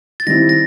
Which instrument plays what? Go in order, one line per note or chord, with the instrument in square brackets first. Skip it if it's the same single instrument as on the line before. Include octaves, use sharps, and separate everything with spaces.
[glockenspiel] A6
[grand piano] D#3 G3 C4 E4 [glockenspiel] A#6
[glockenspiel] A#6